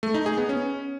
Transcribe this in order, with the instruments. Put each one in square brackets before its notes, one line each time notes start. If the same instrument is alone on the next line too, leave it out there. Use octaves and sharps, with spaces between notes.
[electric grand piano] A3
D#4
G#4
B3
C#4